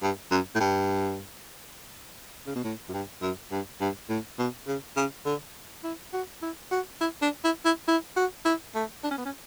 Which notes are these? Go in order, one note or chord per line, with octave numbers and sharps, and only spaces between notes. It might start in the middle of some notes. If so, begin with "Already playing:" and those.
G2
F#2
A2
G2
C#3
B2
A2
F#2
G2
F#2
G2
G2
A2
B2
C#3
C#3
D3
E4
F#4
E4
F#4
E4
D4
E4
E4
E4
F#4
E4
A3
D4
C#4
B3
C#4